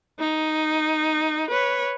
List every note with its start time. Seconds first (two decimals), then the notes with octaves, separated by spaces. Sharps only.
0.19 D#4
1.50 B4 C#5